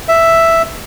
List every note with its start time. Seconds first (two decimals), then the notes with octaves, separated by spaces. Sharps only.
0.08 E5